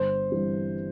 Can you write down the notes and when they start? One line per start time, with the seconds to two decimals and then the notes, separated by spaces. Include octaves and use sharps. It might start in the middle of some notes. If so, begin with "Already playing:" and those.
Already playing: G1 C5
0.31 G2 E3 G3 C4